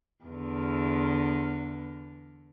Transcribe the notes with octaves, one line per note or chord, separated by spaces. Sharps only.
E2 D3